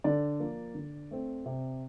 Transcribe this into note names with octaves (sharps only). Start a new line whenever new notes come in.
D3 D5
F3 A#3
D3
A3 C4
C3